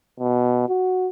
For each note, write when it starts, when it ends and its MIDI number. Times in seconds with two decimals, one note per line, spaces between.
0.20 0.68 47
0.69 1.10 66